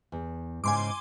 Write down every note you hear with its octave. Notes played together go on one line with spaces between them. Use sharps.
E2
G#2 C#3 G#5 C6 D6